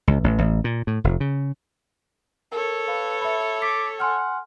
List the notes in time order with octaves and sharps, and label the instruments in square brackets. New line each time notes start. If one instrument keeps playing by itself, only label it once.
[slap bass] C#2
A1
A1
A#2
A2
F1
C#3
[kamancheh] A4 C#5 [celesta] A#4
[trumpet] B4 [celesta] F5
[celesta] E5 B5
[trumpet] D6 [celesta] A6 B6
[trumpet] F#5 [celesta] G#5 C6 F6